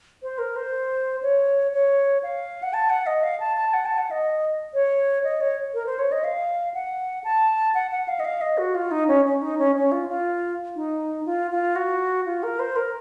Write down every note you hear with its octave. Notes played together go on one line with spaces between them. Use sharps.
C5
A#4
C5
C#5
C#5
F5
F#5
A5
F#5
D#5
F5
A5
A5
F#5
A5
F#5
D#5
C#5
D#5
C#5
A#4
C5
C#5
D#5
F5
F#5
A5
F#5
F#5
F5
D#5
F5
D#5
F#4
F4
D#4
C#4
C#4
D#4
C#4
C#4
F4
F4
D#4
F4
F4
F#4
F4
A#4
C5
A#4